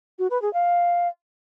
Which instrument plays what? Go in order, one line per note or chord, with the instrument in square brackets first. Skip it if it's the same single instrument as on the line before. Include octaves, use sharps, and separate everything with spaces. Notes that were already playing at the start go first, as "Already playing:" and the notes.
[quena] F#4
B4
G#4
F5